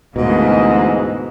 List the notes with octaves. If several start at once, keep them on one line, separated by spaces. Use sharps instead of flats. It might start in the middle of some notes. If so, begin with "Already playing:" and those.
D2 G#2 B2 E3 A#3 D#5